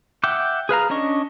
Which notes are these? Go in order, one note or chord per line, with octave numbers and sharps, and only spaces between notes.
E5 F#5 G5 D6
G#4 B4 F5 A#5
C#4 D4 D#5 C#6